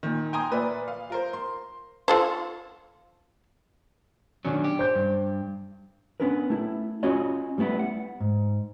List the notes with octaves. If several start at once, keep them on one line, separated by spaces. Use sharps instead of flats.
A#2 D#3
G5 G#5 A#5 C6 D#6
A#2 B4 D5 E5
F5
F4 A#4 C5
C6
F4 A4 C5
B2 D#3 F#3 C#4 D4
G4
C5 G6
G2
B3 C#4 D4 A#4 B4
A3 E4
C#4 F4 F#4 G#4 C#5 D#5
G3 A3 B3 E4
F#5
G#2